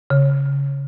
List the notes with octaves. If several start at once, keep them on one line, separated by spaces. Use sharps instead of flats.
C#3